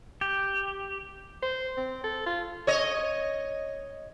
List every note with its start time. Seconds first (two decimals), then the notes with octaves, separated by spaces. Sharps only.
0.21 G4
1.42 C5
1.77 C4
2.04 A4
2.26 F4
2.67 C#5 D#5